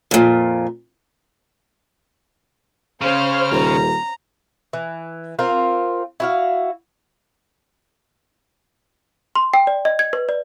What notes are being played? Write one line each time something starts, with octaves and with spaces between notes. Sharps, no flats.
F2 A#2
C#3 C#4 C5 F5 F6
D#1 A#5
E3
C4 F4 A#4
E4 F#4 F5
C6
G5
D5
D#5
G#6
B4
D5